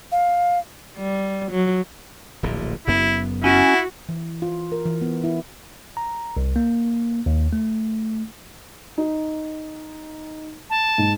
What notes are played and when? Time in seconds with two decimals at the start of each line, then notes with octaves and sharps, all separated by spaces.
0.12 F5
0.98 G3
1.52 F#3
2.43 D1 A#1 A#2
2.87 F#1 F#2 B3 E4
3.44 C#4 E4 F#4
4.09 E3
4.42 F4
4.72 A#4
4.85 E3
5.01 B3
5.24 E4
5.97 A#5
6.37 C2
6.56 A#3
7.26 D#2
7.53 A3
8.98 D#4
10.70 A5
10.98 G#2